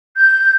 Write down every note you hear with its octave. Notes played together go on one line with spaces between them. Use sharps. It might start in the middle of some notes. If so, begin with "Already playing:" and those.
G6